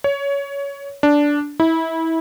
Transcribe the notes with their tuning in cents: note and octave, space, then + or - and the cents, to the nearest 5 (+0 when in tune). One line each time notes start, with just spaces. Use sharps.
C#5 +20
D4 -10
E4 -25